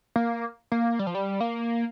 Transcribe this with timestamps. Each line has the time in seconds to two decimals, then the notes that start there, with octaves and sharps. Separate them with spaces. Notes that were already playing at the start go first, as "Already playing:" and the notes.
0.16 A#3
0.72 A#3
0.99 G3
1.07 F3
1.15 G3
1.40 A#3